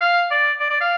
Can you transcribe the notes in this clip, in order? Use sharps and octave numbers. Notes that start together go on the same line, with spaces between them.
F5
D5
D5
D5
F5